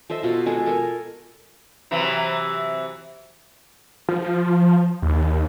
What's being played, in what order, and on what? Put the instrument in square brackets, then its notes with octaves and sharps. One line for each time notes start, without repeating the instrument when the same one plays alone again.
[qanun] A4 C5 D#5 E5
B2 F4
G#3 G#4 A4
A4 A#4 G#5
[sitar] C3 E3 F#3
[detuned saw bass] F3
D#2